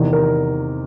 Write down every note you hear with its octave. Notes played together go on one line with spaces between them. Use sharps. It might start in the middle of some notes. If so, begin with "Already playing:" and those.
Already playing: E2 C3 D#3
A#4